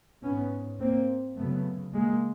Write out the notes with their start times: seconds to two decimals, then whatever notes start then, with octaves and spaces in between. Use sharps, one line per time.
0.23 G#2 B3 C#4
0.79 A#3 C4
1.37 F#2 C#3 A3 B3
1.93 G#3 A#3